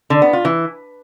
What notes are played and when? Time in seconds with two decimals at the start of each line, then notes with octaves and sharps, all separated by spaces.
0.10 D3
0.22 B3
0.33 F4
0.45 E3